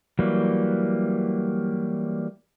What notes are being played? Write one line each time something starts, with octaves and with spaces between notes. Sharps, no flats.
E3 F#3 G3 A#3